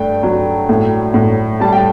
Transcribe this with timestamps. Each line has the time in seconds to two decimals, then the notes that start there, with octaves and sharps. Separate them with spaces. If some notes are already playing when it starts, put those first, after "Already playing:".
Already playing: G2 A3 G5
0.23 F#3
0.69 A2
1.14 A2
1.60 G3 A5
1.73 G5